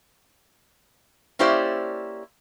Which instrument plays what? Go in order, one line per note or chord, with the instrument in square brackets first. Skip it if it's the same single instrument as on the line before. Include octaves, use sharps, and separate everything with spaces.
[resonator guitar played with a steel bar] A#3 C#4 E4 G4 C5 D5